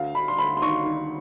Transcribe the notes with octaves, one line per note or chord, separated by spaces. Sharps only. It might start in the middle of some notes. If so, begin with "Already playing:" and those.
Already playing: D2 F5
D2 B5
C6
D2 B5
C6
D#3 C#6
D#3